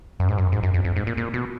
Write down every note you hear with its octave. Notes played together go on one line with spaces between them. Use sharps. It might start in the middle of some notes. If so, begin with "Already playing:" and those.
F#2
G#2
F#2
G#2
F#2
F2
F2
G#2
A#2
A#2
B2